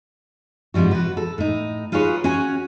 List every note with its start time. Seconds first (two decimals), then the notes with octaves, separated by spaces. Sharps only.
0.74 G#2 C3 F3 G3 F#4
0.91 F#4 B4
1.17 A4
1.38 A2 D#4
1.92 D#4 F4 F#4 G#4 B4 C#5
2.24 C#4 F#4 C#5 G#5